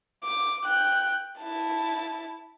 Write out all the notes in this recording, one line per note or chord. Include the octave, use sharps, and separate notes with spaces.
D6
G5 F#6
E4 A5